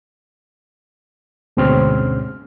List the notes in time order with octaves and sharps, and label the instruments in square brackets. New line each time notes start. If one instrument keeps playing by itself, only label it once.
[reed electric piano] D2 G#2 B2 C4 C#4 F6